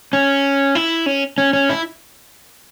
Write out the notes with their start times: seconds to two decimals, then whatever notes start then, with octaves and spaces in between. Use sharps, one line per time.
0.13 C#4
0.75 E4
1.06 C#4
1.38 C#4
1.53 C#4
1.70 E4